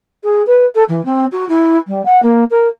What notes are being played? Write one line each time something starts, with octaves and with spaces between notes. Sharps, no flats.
G#4
B4
A4
E3
C4
F#4
E4
G3
F#5
A#3
A#4